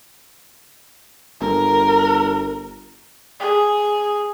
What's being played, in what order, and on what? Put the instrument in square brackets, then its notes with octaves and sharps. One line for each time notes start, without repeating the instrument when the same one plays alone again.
[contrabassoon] G1 [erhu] A#4
[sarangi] G#4